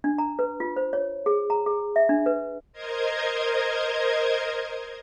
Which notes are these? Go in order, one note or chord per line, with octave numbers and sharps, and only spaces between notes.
D4
A#5
B4
F4
C5
C#5
G#4
A#5
G#4
E5
D4
B4
A#4 C5 D#5 G#6